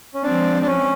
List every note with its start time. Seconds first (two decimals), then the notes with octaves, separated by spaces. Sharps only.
0.14 C#4
0.23 F3 G#3 C4 D4
0.62 D4
0.67 C#4